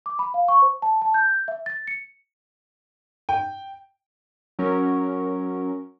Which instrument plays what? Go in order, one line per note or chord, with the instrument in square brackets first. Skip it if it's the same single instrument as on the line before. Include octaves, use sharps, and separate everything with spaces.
[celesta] D6
B5
F5
C#6
C5
A5
A5
G6
E5
A6
C#7
[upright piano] G5
[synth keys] F#3 C#4 A#4